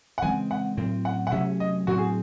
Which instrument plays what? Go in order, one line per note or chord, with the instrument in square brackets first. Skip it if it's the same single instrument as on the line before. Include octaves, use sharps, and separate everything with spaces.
[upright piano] F#5
[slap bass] C#3 E3 G#3 C4 [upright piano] G#5
[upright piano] F#5
[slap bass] A2 F#3 C4
[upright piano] F#5
F#5
[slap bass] C3 F#3 A3 C#4 [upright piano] E5
[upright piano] D#5
[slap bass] A2 F#3 C4 [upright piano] F#4
[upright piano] G#4